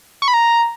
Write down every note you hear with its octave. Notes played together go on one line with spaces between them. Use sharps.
C#6
B5
A#5